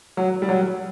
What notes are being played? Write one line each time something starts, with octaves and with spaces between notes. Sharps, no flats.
F#3
G3
F#3